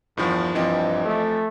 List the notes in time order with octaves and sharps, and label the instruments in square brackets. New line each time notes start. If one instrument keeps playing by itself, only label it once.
[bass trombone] E2 [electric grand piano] G2 D#3 F3
[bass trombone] G2 [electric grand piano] E3 F3 C4 [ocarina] D#5
[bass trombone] A3